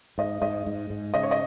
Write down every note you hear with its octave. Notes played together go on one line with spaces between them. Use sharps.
G#2 D#5
G#2 D#5
G#2
G#2
C#3 D#5
C#5
D#5